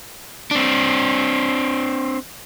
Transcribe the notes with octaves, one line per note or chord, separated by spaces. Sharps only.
C4 D4